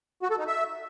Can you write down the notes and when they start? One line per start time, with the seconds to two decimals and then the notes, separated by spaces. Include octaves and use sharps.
0.22 F#4
0.31 A4
0.39 D#4
0.47 E5